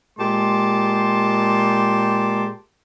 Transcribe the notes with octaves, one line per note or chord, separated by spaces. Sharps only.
A#2 G#3 G4 A5 C6